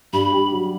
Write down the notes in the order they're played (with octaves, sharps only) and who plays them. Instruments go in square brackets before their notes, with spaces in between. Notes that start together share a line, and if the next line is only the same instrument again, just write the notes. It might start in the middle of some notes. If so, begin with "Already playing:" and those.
[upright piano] G2 [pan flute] B5
[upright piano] G4
F#3